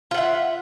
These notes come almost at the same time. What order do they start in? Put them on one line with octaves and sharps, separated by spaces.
F4 F#5 E5